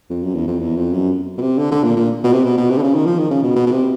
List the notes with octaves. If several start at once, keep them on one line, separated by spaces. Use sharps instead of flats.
F2
F#2
E2
F2
E2
F2
F#2
B2
C3
D3
D3
A#2
A#2
B2
C3
B2
B2
C3
D3
C#3
D#3
F3
D#3
C#3
B2
B2
B2
C3